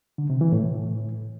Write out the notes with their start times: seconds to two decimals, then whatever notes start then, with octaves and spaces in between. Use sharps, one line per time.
0.18 D3
0.30 C3
0.41 E3
0.52 A2